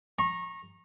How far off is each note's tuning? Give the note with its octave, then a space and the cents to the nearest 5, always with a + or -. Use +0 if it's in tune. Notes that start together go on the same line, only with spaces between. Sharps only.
A#5 +0 C#6 -30